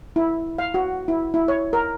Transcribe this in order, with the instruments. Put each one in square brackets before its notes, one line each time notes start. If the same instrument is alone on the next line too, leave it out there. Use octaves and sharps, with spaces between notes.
[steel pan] E4
F5
F#4
E4
E4
C#5
A#4